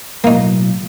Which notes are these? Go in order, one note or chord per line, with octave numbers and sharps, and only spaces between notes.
B1 A2 F#3 A#3 D#4